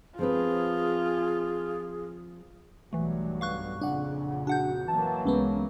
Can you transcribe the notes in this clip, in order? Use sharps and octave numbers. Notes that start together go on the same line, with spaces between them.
F3 C4 F4 G#4 B4
B1 G2 E3 F#3 A3
F5 C#6 F#6
F2 A#2 C#3 D4 F#5
D4 F#4 F#5 G6
E3 F#3 A#3 A5
C2 G#3 B3 C#4